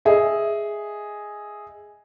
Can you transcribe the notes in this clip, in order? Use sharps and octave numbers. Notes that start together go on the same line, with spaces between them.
G#4 D#5 E5